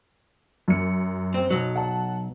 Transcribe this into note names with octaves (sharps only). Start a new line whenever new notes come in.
F#2 C#7
C4
B1 F#3
F#5 A5